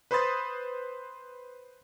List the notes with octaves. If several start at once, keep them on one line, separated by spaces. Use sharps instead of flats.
B4 C5 B5 C6 D#6 A6